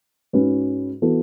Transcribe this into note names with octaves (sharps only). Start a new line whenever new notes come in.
G#2 G#3 C#4 F#4 B4
E3 B3 F#4 A4